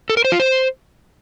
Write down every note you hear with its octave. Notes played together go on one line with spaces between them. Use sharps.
A4
A#4
C5
F4
C5